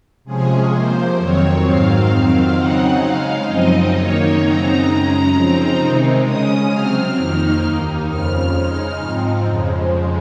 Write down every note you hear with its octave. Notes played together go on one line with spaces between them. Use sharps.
C3 F3 G#3 C#4 G#4
C3 F3 A#3 C5
F2 D#3 F#3 C4 C#5
G#2 D#3 F#3 C4 F5
F2 D#3 F#3 C4 F5
C#3 F#3 C4 D#4 F#5
C#3 G#3 D#4 F5
F#2 C#3 F3 C4 D#4 D#5
F#2 D#3 A#3 D#4 C#5
F#2 C#3 F#3 C4 D#4 A#5
F#2 C#3 G#3 C#4 A#5
C#3 F3 C4 D#4
C3 D#3 G#3 C4 D#4
C#3 G#3 C#4 D#6
C3 F#3 C4 F6
F2 D#3 A#3 D#4
D#2 D#3 A#3 D#4
F2 C#3 F3 F6
C#3 G#3 D#4
G#2 F3 C4 D#4
F2 C#3 F3 G#3